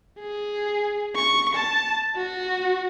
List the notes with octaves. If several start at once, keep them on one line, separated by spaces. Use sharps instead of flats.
G#4
C#6
A5
F#4